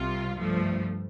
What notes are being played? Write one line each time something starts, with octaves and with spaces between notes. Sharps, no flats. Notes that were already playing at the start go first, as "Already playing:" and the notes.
Already playing: C2 C3 G3 F4
G2 F3 A3